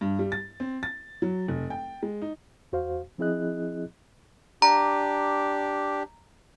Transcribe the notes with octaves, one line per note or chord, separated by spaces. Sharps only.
G2
G3
A6
C4
A6
F#3
F1
G5
G#3
D#4
E2 F#4 C5 F5
F3 C4 E4 G#4 D#5 F#6
D4 G4 A#5